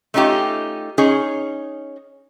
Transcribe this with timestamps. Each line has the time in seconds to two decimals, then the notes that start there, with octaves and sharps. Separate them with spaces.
0.14 A3 C#4 D#4 F4 G4
0.98 C#4 D#4 G#4 C#5